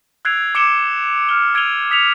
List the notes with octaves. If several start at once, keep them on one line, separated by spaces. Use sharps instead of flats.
E6 F#6 G#6 C7 D7 F7
D6 G#6 C#7 D7 E7 G7
F6 G7
E6 G#6 D7 D#7 F7 G7
D#6 B6 C#7 F7